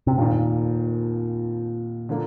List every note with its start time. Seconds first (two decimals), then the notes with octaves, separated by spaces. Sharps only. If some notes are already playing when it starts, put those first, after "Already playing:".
0.07 C3
0.18 F1 D#2 A#2 D#3
2.09 D3 F3 A#3